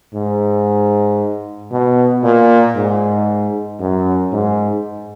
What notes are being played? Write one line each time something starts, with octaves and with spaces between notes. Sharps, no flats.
G#2
B2
A#2
G#2
F#2
G#2